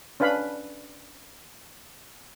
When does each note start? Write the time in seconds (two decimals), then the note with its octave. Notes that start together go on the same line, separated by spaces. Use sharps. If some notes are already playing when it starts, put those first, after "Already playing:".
0.20 C#4 D4 B4 F5 B5